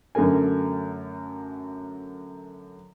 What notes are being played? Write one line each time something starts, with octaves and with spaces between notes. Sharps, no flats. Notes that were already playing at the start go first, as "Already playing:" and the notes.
F#2 D3 A3 A#4 G#5